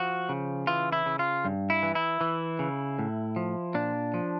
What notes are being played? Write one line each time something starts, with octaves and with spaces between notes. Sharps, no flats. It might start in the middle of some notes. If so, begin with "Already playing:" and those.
Already playing: F3 F#4
C#3
E3 F4
E4
C#3
F4
G2
E4
E3
E4
E3
C#3
A2
F3
A#2 D4
F3